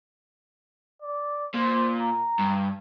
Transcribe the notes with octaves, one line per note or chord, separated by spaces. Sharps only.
D5
A#2 C5
A#5
G2